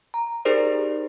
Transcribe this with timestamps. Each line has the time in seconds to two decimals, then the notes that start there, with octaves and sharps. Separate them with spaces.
0.14 A#5
0.45 D#4 G4 G#4 A#4 C5 D5